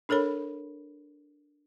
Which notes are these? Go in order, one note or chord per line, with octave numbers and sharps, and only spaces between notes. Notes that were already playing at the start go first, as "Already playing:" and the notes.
D4 A4 A#4 C#5 B5